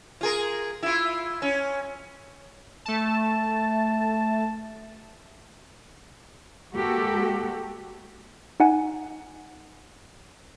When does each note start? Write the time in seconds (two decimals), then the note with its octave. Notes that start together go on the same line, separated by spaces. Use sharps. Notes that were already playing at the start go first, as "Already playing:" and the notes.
0.21 F4 G#4 A#4
0.83 E4 F4
1.42 C#4
2.86 A3 A5
6.74 G#3 A#3 F#4 G4 A4
8.60 D#4 F#5 G#5